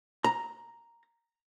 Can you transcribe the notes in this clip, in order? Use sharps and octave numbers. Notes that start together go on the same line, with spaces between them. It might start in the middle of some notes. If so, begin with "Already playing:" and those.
A#5